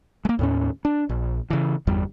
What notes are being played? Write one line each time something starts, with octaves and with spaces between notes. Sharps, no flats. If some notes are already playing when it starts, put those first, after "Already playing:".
G#3 A#3
D#2 A2 C#4
D4
A#1
C#3 E3
G1 E2 G3